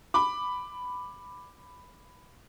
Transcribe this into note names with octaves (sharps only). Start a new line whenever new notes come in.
B5 D6